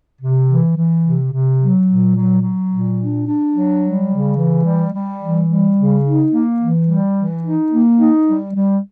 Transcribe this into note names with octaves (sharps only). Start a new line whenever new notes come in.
C3
E3
E3
C3
C3
F#3
A#2
F#3
F#3
A#2
D4
D4
F#3
G3
C#3
E3
G3
G3
E3
G3
C#3
D#4
A#3
E3
G3
E3
D#4
A#3
D#4
G3
G3